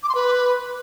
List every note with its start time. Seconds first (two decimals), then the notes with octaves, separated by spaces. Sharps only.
0.03 D6
0.09 C6
0.15 B4